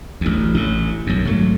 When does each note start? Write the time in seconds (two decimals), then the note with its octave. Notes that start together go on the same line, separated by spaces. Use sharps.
0.21 A1 D2
0.54 A1 A2
1.07 B1 F#2
1.25 G#1 F#3 A3